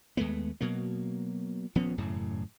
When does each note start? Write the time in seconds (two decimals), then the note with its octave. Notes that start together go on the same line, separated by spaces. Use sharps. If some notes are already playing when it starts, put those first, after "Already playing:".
0.17 D#2 G#3 A3 B3
0.61 B2 F#3 A#3
1.75 D#1 F3 B3 C#4
1.97 E1 F#2 A2 C#3